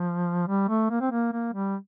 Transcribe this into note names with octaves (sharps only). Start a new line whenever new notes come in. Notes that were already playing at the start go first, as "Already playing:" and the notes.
Already playing: F3
G3
A3
A#3
C4
A#3
A#3
G3